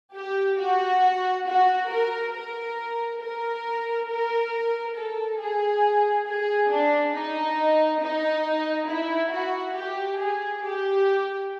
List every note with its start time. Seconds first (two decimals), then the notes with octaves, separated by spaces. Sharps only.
0.16 G4
0.59 F#4
1.47 F#4
1.90 A#4
2.34 A#4
3.22 A#4
4.09 A#4
4.96 A4
5.40 G#4
6.27 G#4
6.71 D4
7.15 D#4
8.01 D#4
8.89 E4
9.32 F#4
9.77 G4
10.19 G#4
10.64 G4